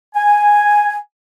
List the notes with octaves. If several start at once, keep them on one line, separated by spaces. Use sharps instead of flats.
G#5